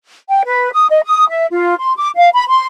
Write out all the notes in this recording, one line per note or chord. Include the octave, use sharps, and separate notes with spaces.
G5
B4
D#6
D#5
D#6
E5
F4
C6
D6
F5
B5
C6